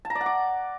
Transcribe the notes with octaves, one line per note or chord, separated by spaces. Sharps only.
A5
A#5
D5
F#5
D6